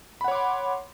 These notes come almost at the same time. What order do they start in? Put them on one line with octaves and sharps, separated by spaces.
B5 F#5 C#5 D6 C6